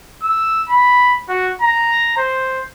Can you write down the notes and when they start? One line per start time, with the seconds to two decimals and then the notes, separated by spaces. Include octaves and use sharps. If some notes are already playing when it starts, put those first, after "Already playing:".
0.23 E6
0.69 B5
1.29 F#4
1.62 A#5
2.17 C5